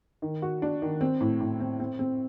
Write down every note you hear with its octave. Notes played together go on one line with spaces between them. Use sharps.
D#3
F#4
D4
D#3
C4
A2
A2
C4
C4
C4